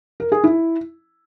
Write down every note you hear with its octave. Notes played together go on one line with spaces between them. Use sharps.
A#4
G#4
E4